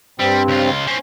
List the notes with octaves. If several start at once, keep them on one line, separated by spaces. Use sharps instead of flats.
G2 G3 C4
C#2 F4
C4 C#4